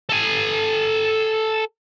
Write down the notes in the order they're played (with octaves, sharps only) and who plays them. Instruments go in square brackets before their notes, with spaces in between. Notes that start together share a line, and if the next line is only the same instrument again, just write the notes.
[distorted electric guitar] A4 G#5